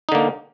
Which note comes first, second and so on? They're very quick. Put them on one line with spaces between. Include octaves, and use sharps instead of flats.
D#4 D3 A#3